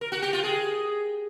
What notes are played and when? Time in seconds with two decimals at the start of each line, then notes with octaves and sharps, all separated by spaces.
0.01 A#4
0.12 F#4
0.22 G4
0.33 F4
0.44 G#4